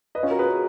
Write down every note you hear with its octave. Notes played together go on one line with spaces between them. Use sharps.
B4 D#5
C#4 F4
F#4 A#4
G#4 B4